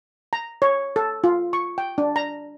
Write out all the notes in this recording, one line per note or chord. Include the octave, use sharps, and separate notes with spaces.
A#5
C#5
A4
F4
C#6
G5
D4
A#5